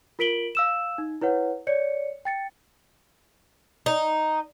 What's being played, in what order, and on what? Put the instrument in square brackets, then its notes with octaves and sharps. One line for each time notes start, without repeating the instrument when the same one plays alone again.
[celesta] F4 A#4 B6 D7 F#7 G7
F5 E6 E7
D#4
E4 B4 C#5 F#5
C#5 D5 C#7
G5 A6 C#7
[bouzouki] D#4